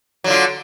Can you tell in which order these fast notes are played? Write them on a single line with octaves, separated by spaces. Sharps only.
F#3 D3 F4